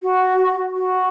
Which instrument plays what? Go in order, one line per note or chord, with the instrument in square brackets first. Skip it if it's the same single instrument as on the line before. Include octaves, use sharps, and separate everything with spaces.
[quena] F#4
F#4